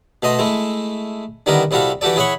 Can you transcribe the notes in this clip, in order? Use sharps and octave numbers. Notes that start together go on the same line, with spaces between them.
B2 A3 D#5 C6
G#3 A3 E4
D3 D#3 G3 B3 E4 A#4
C2 G3 E4 F#4 A4 F5
E3 F#4 G4 A4 D5
E4 G#4 C#5 F#5 B5 C#6